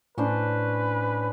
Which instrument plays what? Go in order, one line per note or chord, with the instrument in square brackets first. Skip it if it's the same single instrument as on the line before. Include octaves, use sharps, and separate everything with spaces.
[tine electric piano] A2 [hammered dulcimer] C#4 D4 C5 [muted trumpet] B4